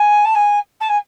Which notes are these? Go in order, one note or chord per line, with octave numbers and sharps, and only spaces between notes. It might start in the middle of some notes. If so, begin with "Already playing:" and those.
Already playing: G#5
A5
G#5
A5
G#5